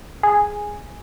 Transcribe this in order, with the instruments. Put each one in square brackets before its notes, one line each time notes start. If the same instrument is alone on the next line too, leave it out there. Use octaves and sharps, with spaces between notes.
[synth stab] G#4